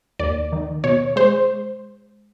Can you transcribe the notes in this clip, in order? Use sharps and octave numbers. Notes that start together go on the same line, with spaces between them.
D#2 D5
D#3
B2 C#5
G#3 C5